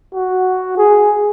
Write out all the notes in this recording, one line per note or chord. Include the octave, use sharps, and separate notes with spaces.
F#4
G#4